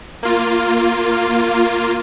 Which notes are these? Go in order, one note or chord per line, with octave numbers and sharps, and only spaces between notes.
A#3 F4